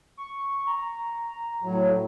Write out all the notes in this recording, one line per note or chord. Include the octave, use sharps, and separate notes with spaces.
C#6
A#5
A2 F#3